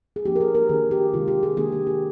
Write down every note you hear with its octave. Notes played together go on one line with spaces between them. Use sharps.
G#4
F3 A#3 D4 G4
A#4
G#4
A#4
D#3 A#3 D4 G#4
G4
C3 D#3 G#3 F4
G4
G#4
D#3 A#3 D4 G#4
G4
G4